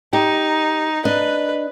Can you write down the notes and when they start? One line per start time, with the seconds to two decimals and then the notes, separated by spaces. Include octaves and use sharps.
0.13 D#4 G4
1.05 D4 B4 D#5